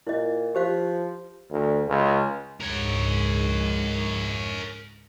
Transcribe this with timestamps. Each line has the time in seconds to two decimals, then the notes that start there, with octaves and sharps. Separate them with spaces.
0.07 A#2 E4 D#5
0.55 F3 G4 C5 F5
1.51 D2
1.87 C#2
2.61 C#2 G#2 A#4 C#5